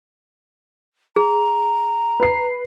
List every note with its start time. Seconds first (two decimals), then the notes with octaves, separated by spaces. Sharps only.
1.16 G#4 A#5
2.20 B4 C7